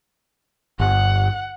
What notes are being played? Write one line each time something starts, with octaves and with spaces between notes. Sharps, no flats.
G1 F#5